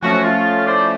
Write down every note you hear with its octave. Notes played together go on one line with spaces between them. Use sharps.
F3 F#3 A3 C#4 F#4
F4
E4 C5 D5